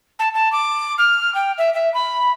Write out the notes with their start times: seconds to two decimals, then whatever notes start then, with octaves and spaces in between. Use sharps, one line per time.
0.19 A5
0.34 A5
0.52 D6
0.98 F6
1.35 G5
1.58 E5
1.74 E5
1.94 B5